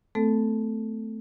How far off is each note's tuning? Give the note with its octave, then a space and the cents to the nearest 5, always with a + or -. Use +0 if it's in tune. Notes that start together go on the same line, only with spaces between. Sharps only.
A3 +0 C4 -35 A4 +0